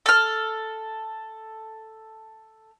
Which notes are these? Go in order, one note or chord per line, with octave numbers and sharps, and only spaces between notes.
A4 F6